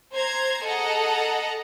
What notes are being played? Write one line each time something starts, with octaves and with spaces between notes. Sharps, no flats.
C5 A#5 G#6
G#4 A4 D#5 F#5 A5 A#5